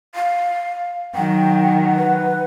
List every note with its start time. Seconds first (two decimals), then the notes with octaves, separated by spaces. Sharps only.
0.15 F5
1.15 D#3 F#3 F#5 G5
1.97 B4